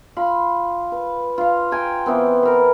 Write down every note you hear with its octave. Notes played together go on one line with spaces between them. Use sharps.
F4 B5
B4
F4 F5
G5 G#5 A#5
E3 B3 C4
A#4 B4